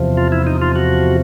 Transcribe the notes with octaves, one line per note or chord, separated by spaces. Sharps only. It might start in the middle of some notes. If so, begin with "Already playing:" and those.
Already playing: E2 C3 F3
F4
E4
D#4
F4
F#4